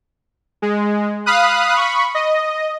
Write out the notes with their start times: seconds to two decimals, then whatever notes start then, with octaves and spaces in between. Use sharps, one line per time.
0.62 G#3
1.26 F5 B5 D#6 F#6
1.77 B5 C#6
2.15 D#5